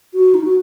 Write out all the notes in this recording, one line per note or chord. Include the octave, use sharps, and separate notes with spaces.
F#4
D#4
F#4